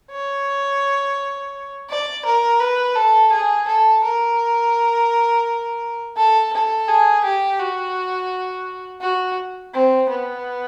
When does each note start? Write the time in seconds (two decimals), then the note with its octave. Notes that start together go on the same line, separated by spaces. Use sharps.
0.11 C#5
1.89 D5
2.26 A#4
2.60 B4
2.96 A4
3.32 G#4
3.68 A4
4.04 A#4
6.17 A4
6.53 A4
6.88 G#4
7.24 G4
7.59 F#4
9.01 F#4
9.74 C4
10.09 B3